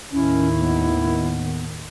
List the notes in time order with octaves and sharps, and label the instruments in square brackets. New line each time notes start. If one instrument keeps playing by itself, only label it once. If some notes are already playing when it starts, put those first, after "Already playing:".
[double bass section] D#2 A2 D#3 [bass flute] C#4 [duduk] E4
[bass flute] B3